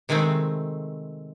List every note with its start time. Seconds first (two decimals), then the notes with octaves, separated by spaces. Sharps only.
0.09 C3 D#3 G#3 A3 C4